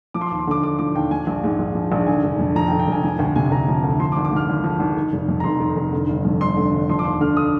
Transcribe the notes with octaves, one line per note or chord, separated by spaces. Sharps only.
F3 D6
C6
D6
D#2
C6
D3 D6
D#2 D6
F3 D6
D#2 G5
F3 G#5
A#1
G#2
A#1
F3
A#1
D3 G#5
F1
F2
F3 A#5
G5
D3
G5
F1 G#5
F3 G#5
D2 G5
C3 G#5
D2 A#5
F3
D2
F3 C6
D6
G#1
D6
G#2 F6
G#1
F3
G#1
D#3
F1
F2
A#5
F1 C6
D#3
F1
D3
G1
F2
G1 C6
D3
G1
F3 C6
D6
D#2 C6
D3 F6
D#6